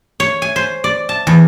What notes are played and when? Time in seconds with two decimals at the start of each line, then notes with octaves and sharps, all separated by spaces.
0.20 C#5
0.42 G#5
0.56 C5
0.84 D5
1.09 A5
1.27 E2